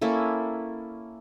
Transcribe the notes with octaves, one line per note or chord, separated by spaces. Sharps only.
A#3 C#4 E4 A4